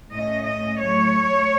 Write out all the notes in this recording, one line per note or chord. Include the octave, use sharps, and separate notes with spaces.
A2 A3 C#4 D#5
D#5
A2 F#3 A3 C#5